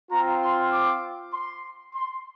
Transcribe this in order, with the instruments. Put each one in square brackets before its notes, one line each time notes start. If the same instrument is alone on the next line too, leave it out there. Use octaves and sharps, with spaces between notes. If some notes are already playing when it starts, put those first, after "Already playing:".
[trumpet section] C4 F4 A#5
C6
D6
C6
C6